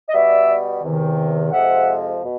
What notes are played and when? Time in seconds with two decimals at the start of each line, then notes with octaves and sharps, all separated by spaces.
0.09 D#5
0.13 B2 G3 B3 D5 E5
0.82 E2 C3 D#3
1.52 F2 C3 F3 G#3 E5 F#5
2.23 B2